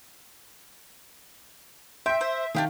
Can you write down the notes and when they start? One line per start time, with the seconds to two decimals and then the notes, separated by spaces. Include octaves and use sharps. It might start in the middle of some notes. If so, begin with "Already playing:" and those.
2.06 E5 G5 C6 D7
2.21 C5
2.55 D#3 D4 G4 G#4 F5